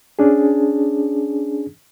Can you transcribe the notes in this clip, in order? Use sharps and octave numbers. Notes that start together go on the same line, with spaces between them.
C#4 D4 G#4